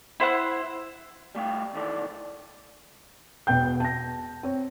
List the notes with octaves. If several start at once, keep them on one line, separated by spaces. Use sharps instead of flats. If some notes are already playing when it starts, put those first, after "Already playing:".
E4 C5 F#5 F#6
G3 A3 F5 G5
B1 F#2 D#3 E3 A4 D5
E1 B2 G5 G6
A5 A#6
C4 C#5